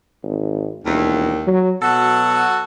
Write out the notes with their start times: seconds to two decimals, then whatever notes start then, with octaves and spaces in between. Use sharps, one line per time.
0.23 G#1
0.85 E1 D#2
1.47 F#3
1.82 B2 F#3 F#4 A4